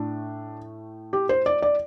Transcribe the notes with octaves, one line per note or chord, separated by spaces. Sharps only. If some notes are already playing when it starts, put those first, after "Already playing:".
Already playing: A2 A3 D4
G4
C5
D5
D5